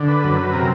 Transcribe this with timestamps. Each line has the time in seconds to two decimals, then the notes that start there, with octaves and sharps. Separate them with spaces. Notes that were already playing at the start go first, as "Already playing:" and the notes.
Already playing: D3
0.09 B4
0.24 F#2
0.54 C3 A#4